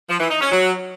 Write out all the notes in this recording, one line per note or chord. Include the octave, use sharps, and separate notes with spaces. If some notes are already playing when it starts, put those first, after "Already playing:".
F3
E3
D#4
C#4
F#3